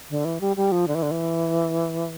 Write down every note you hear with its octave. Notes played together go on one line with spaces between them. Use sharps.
D3
E3
G3
G3
F3
D3
E3
D3
E3